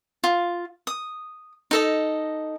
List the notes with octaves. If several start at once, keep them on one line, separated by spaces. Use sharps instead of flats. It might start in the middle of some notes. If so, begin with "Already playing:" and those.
F4
D#6
D#4 A4 D#5